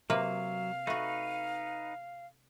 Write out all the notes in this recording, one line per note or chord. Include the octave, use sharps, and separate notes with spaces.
C3 F#3 A#3 B4 F5
A3 D#4 F#4 B4